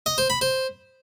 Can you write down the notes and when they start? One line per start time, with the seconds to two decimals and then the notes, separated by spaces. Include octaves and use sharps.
0.06 D#5
0.18 C5
0.30 B5
0.41 C5